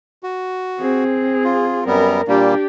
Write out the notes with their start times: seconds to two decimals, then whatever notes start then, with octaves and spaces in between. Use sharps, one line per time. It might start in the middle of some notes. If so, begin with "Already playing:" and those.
0.23 F#4
0.79 C4 G#4
1.44 F4
1.86 F#2 G3 B3 A#4
2.28 A#2 G3 A#3 D4 G4